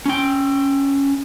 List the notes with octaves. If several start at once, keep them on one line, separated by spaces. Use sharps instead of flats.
C#4 G5